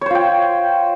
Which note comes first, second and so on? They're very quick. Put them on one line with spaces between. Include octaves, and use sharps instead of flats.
C#5 C5 F4 G5